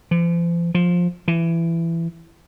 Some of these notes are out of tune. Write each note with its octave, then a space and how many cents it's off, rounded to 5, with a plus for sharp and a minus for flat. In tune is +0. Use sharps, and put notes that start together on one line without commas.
F3 -45
F3 +15
E3 +20